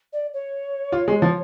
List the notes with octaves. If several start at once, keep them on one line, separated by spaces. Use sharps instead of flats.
D5
C#5
F4
G#3
F3